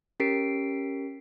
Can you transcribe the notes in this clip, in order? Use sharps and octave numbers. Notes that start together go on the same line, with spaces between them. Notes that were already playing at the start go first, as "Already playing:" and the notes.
C#4 G4 A#4 B6 C7 D7